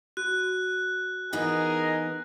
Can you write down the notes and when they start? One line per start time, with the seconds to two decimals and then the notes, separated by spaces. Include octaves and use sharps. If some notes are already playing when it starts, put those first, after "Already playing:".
0.17 F#4 F#6
1.33 E3 B3 D#4 G#4 A#4 D#5